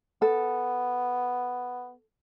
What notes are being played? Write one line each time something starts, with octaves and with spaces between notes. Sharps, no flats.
B3 A4